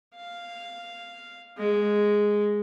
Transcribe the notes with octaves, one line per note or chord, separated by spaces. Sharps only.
F5
G#3